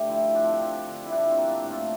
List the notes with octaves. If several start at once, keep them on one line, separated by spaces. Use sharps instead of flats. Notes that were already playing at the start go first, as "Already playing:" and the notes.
Already playing: D3 A3 G4
F3 E4
F3 D4
C4
D4
F3
D3
E4
G3 D4
C4
A#3
D4
A2
F4